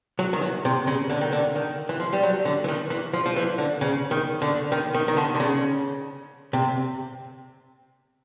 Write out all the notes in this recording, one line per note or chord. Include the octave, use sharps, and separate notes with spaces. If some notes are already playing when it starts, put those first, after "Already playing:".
F#3
D#3
E3
C3
C#3
D3
D#3
D3
D#3
E3
F3
G3
F#3
D3
E3
D#3
E3
F3
F3
E3
D3
C#3
D#3
D3
D#3
D#3
D#3
D3
D3
C#3
C3